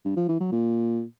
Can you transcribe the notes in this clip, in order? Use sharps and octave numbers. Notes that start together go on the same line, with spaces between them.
G2
F3
E3
F#3
A#2